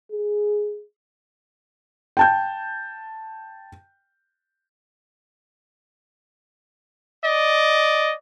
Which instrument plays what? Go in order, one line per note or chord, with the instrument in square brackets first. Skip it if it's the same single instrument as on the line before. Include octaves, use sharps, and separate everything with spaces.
[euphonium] G#4
[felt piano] G5 A5 G6
[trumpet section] D5 D#5